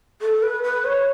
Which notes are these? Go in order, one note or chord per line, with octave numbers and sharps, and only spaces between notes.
A4
B4
B4
C#5